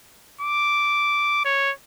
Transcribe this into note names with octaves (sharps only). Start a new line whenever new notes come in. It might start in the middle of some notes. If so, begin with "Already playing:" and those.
D6
C#5